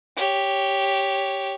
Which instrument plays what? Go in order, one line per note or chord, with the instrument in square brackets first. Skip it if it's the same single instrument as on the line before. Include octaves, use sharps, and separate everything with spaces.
[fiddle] G4 C#5